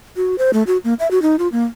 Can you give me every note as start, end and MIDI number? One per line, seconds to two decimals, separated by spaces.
0.16 0.36 66
0.38 0.51 72
0.53 0.63 57
0.67 0.78 66
0.84 0.94 58
1.00 1.10 76
1.11 1.22 66
1.22 1.36 63
1.39 1.48 65
1.52 1.65 58